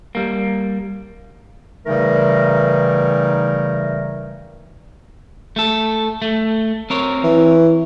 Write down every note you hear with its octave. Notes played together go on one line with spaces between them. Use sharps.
G3 A#3
C#3 E3 G3 A3 D#4 A#4
A3 A4
A3
C4 A#4 C#5
E3